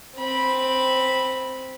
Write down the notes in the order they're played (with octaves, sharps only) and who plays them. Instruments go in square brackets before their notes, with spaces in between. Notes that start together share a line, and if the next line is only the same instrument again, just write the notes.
[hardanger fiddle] C4 B5